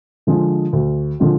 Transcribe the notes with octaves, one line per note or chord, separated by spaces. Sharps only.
D3 F3 G#3
D2
D3 F3 G#3